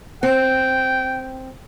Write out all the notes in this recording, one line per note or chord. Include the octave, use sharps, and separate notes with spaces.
C4 G5